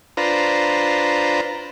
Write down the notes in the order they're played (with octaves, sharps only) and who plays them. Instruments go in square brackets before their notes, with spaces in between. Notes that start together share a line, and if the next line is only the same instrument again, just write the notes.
[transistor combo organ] D4 F4 B4 C5 A#5